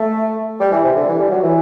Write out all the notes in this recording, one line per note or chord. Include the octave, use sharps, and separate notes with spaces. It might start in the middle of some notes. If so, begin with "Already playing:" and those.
Already playing: A3
G3
E3
C3
D3
E3
G3
F#3
E3